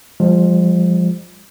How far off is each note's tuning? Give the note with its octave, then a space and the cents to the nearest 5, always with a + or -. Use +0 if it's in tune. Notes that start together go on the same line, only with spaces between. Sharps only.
F3 +5 G#3 -40